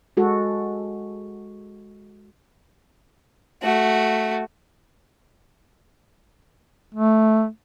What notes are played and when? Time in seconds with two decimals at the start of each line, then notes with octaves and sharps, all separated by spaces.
0.17 G#3 F#4 A4
3.62 A3 F#4
6.95 A3